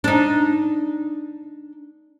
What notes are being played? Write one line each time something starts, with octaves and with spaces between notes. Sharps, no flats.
D4 D#4